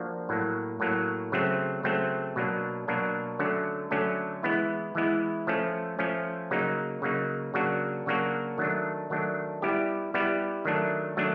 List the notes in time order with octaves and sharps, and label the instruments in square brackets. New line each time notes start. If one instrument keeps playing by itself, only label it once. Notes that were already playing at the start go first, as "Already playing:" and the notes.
Already playing: [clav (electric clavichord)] F3 A#3 D4 F#4
A2 F#3 A#3
A2 F#3 A#3
C#3 F#3 A3 C4
C#3 F#3 A3 C4
B2 F#3 A#3 D4
B2 F#3 A#3 D4
D3 F#3 A3 C#4
D3 F#3 A3 C#4
E3 G#3 B3 E4
E3 G#3 B3 E4
F3 A3 C#4
F3 A3 C#4
C#3 F#3 A#3 D#4
C#3 F#3 A#3 D#4
C#3 F#3 A#3 D4 F#4
C#3 F#3 A#3 D4 F#4
D#3 F#3 A3 D4
D#3 F#3 A3 D4
G3 B3 E4 G4
G3 B3 E4 G4
D#3 F#3 A3 D4
D#3 F#3 A3 D4